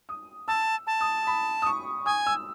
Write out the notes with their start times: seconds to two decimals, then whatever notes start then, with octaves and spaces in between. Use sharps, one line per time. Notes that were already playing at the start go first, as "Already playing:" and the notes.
0.09 D#6
0.48 A5 E6
0.87 A5
1.01 D#6
1.27 B5
1.62 D#6
1.66 C#6
2.06 G#5 D#6
2.26 E6